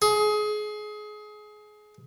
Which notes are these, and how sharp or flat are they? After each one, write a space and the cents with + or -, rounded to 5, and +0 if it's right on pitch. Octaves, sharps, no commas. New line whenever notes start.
G#4 +25